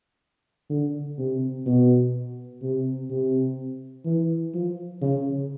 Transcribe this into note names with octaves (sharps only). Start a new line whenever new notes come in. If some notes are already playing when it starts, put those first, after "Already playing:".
D3
C3
B2
C3
C3
E3
F3
C#3